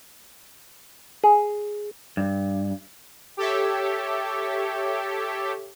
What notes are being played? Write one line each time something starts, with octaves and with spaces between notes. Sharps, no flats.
G#4
G2
G4 A4 C#5 E5